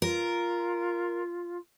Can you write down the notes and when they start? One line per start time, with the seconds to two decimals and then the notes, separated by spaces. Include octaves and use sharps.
0.02 F4 A#4